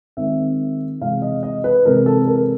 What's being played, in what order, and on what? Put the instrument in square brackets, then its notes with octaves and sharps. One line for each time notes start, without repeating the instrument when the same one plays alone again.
[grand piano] D#3 G#3 C4 E5
C3 E3 G#3 F5
D#5
D#5
B4
C3 E3 G#3 A#4
A4
A#4